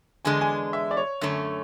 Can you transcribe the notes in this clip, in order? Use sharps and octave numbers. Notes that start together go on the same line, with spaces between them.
E2 D3 G#3 D4 G#5
G#5
E5
D5
C#5
F#2 D3 A3 C#4